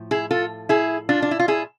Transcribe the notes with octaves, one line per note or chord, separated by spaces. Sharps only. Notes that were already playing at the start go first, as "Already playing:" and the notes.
Already playing: A2 F3
E4 G#4
F4 A4
E4 G#4
D4 F4
D4
E4
F4
E4 G#4